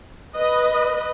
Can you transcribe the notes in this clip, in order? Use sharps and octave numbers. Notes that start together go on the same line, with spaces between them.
B4 D#5